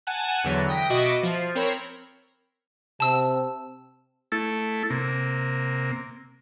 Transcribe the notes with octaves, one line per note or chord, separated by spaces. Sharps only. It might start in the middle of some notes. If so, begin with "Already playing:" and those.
F#5 G#5 A5 F#6
E2 D3 E3 F#3
G5 D#6 A#6 B6
B2 F#4 D#5 E5 D6 D7
F3
C4 A#4 C#5 B5
C3 A5 E6
A3 E4 A4
C3 A#3